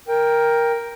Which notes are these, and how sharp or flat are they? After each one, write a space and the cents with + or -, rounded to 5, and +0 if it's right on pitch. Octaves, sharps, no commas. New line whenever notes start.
A#4 +5 G5 +10